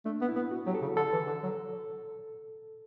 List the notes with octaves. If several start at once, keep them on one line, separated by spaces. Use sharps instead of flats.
A3 D4
B3
E4
B3
F#4
F#3 G4
A4
C#3
D3 A4
E3
D3
F#3